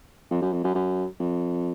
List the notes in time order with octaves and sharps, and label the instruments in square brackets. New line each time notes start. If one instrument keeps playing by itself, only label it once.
[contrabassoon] F2
F#2
F2
F#2
F#2
F2